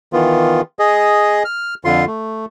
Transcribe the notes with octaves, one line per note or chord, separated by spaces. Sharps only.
D#3 E3 B3 F4
G#4 D#5
F6
F2 D3 F4 C6
A3